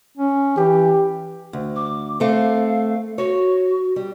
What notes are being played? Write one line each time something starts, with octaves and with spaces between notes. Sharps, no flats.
C#4
E3 G4
D2
D6
A3 C4 F5
F#4 C#5
G3